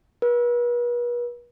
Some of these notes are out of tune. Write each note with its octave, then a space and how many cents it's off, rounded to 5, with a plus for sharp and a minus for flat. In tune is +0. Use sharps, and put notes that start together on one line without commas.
B4 -40